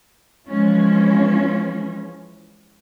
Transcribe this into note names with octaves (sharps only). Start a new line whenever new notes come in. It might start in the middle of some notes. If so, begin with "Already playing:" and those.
E3 F3 G#3 C#4